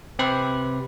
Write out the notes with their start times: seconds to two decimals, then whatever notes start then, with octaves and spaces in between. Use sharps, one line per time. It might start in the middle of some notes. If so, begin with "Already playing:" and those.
0.19 C3 C4 G4 B4